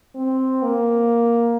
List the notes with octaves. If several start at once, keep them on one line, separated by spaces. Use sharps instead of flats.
C4
A#3